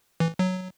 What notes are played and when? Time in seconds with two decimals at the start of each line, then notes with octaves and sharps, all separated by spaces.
0.20 E3
0.39 F#3